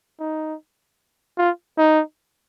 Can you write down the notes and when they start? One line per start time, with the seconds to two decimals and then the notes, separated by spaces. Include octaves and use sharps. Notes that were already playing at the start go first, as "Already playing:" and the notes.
0.20 D#4
1.38 F4
1.78 D#4